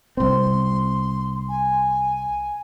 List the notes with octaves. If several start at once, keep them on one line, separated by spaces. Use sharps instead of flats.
C2 C4 C6
G#5